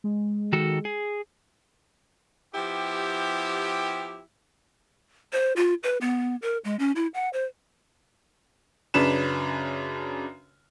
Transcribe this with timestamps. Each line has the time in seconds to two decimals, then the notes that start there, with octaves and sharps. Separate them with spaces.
0.04 G#3
0.53 D#3 F#4 A4
0.85 G#4
2.55 F3 B3 E4 G4
5.33 C5
5.56 F4
5.83 B4
6.01 B3
6.42 A#4
6.65 G#3
6.79 C#4
6.96 E4
7.14 F#5
7.33 C5
8.94 F#2 C#3 D4 B4 E7